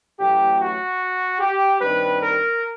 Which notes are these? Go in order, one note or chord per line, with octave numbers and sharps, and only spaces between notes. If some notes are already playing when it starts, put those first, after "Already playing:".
A1 A2 F#3 G4
F#4
G4
G2 D#3 G3 C4 B4
A#4